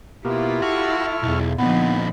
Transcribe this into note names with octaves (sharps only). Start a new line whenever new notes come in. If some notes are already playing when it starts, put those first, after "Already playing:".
B2 A#3 E4 F4 G4
F#4 A4 C#6 F6
B1 E2
A#2 D3 F3 B3 C4 D#4 B5